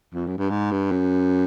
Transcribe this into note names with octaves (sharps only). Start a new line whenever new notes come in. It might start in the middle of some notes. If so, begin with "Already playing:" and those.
F2
F#2
G2
G#2
G2
F#2